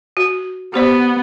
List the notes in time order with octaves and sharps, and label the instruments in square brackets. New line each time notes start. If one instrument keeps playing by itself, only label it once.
[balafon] F#4
[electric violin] B3 [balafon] G4 C5 D5